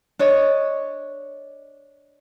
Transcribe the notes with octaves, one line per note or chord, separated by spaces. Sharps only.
D4 C#5 D#5